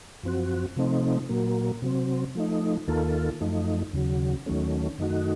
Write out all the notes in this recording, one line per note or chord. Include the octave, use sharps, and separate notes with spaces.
F#2 F3 C4 F#4
C3 F3 A3 C4 D#4
A#2 F#3 A#3
C3 F#3 C4
F3 A3 D#4
D#2 D#3 A#3 F4 A4
F#2 F3 A3 D#4
D#2 C#3 F#3
D#2 D#3 F#3 A3 C#4
F#2 D#3 A3 D#4 F#4